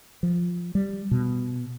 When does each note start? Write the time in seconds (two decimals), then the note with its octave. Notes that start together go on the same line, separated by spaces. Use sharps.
0.23 F3
0.75 G3
1.11 B2